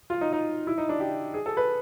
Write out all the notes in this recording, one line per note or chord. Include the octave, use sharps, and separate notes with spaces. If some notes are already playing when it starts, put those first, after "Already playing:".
F4
D#4
D#4
E4
D#4
D4
G4
G#4
A4
B4